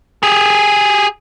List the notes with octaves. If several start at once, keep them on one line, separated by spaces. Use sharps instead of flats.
G4 G#4